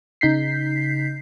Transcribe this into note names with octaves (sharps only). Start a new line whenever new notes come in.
C#3 D#4 G6 B6 C7